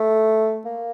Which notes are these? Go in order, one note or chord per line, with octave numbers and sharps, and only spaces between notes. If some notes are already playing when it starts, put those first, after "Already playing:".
Already playing: A3
A#3